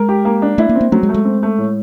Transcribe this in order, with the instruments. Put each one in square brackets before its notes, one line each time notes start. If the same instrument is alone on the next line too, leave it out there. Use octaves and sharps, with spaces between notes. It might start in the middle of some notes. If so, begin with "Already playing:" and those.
Already playing: [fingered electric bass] G#3 [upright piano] A#4
[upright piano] G4
A#3
D4
[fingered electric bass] A3 [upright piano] E4
[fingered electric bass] A#3
[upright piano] C4
[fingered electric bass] A#3
[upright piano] F#3 [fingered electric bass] A3
[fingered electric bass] G#3
[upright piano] A3
[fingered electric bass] G#3
[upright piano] C4
A3
A2